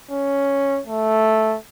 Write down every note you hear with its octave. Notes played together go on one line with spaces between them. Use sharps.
C#4
A3